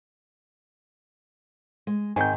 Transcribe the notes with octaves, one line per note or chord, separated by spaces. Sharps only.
G#3
G#2 D#3 C4 A#4 G#5 G6